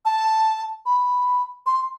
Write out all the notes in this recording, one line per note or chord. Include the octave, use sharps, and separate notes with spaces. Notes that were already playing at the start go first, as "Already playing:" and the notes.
A5
B5
C6